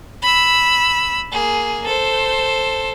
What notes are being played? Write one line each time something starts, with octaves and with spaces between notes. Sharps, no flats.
B5 E6
A#3 G#4
A4 C5